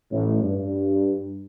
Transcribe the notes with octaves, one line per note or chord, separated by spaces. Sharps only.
A1 A2
G2